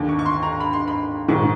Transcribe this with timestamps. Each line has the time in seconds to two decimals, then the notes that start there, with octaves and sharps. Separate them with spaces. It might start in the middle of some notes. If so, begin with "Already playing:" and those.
Already playing: D#2 D3
0.09 C#6
0.19 C#6
0.26 C6
0.43 A#5
0.61 B5
0.73 C6
0.88 B5
1.28 A#1 G#2 D#3 C#6